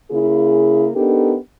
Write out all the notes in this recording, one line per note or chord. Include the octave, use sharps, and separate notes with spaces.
C#3 A#3 E4 G#4
B3 D4 D#4 G4 A4 A#4